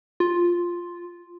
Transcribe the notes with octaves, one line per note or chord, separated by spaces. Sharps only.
F4